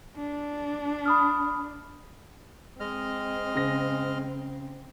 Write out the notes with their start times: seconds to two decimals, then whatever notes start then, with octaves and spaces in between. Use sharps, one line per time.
0.16 D4
1.06 B5 D#6 F6
2.80 G#3 C4 D#5 F6
3.55 C#3 A#6